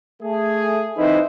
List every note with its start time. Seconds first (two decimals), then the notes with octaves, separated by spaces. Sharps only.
0.21 A3 G#4
0.97 E3 C4 D#4 E4 B4 C5